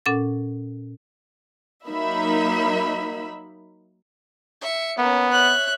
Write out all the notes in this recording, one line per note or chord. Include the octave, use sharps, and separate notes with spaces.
A#2 C#4 A4 F#5 A6
F#3 A#3 D#4 E5 B5
E5 C#7
A#3 B3 C#4
C#5 E5 F#6